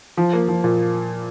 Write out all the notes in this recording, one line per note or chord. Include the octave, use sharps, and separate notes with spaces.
F3
A#3
F3
A#2